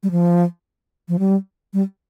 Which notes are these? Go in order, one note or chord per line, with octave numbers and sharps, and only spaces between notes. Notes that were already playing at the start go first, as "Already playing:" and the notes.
G3
F3
F3
G3
G3